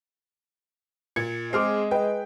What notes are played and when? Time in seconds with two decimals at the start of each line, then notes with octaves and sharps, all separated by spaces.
1.16 A#2 G#6 C#7
1.53 G#3 C4 G#4 C5 D6 F6 C7
1.91 B4 D#5 G5